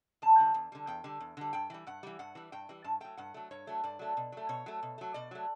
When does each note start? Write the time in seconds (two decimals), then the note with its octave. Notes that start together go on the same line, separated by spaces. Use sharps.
0.22 E2 A5
0.38 D3 G3
0.54 E2
0.72 D3 G3
0.87 E2 G5
1.04 D3 G3
1.20 E2
1.37 D3 G3
1.53 G2 G5
1.70 E3 G3
1.87 G2 F#5
2.03 E3 G3
2.19 G2 F#5
2.35 E3 G3
2.52 G2 G5
2.69 E3 G3
2.84 G2 A5
3.00 F#3 A3 G5
3.17 G2 F#5
3.34 F#3 A3
3.51 G2 C#5
3.67 F#3 A3
3.84 G2 D5
3.99 F#3 A3
4.17 B2
4.32 F#3 A3
4.49 B2 C#5
4.66 F#3 A3
4.83 B2
4.98 F#3 A3
5.14 B2 D5
5.31 F#3 A3